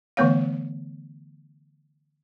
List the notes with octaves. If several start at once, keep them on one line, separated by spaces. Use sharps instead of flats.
D3 E3 A3 B3 C#5 F5